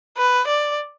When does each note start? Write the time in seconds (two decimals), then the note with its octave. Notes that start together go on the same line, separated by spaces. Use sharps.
0.17 B4
0.47 D5